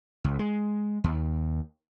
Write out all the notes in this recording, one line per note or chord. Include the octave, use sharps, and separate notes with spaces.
C#2
G#3
D#2